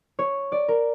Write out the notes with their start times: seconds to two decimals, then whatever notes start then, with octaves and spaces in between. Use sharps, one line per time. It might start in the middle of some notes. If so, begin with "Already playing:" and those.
0.19 C#5
0.52 D5
0.68 A#4